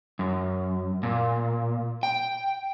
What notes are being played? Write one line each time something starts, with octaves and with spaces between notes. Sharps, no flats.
F#2
A#2
G5